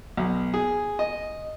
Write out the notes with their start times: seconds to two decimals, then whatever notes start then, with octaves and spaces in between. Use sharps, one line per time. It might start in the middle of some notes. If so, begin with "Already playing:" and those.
0.17 B1
0.54 G#4
0.99 D#5